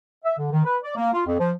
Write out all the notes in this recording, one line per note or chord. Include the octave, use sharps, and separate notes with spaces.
E5
D3
D#3
B4
D5
A#3
F4
F2
F3